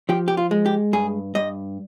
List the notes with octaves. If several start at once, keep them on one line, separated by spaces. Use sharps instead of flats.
F3 G4
G4
F4
G#3
G4
G2 G#4
G2 D#5